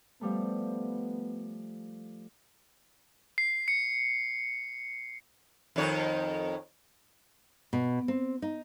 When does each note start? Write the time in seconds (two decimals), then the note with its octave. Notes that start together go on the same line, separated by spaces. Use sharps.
0.21 F3 G3 A3 B3
3.38 C7
3.68 C#7
5.76 F2 D#3 C#5
7.73 B2
8.08 C4
8.42 D#4